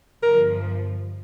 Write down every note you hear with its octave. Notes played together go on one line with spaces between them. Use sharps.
G1 G2 F3 A#4